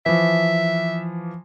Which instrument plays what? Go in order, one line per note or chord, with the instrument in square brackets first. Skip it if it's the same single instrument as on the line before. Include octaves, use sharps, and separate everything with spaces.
[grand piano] E3 F3 [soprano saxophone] E5